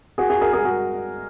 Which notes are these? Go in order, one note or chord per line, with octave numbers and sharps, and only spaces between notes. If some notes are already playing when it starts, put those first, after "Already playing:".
F#4 G#4
F#4 G#4
G#4 A#4
G#4 A#4
F#4 G#4